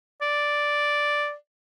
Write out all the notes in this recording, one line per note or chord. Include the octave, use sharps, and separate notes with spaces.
D5